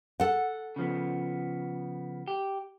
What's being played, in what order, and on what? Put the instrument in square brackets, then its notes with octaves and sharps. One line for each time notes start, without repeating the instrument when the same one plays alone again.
[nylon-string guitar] A4 F#5
[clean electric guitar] C#3 F3 B3
G4